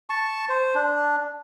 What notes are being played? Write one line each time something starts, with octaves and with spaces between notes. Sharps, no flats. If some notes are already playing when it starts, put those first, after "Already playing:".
A5 C#6
C5
D4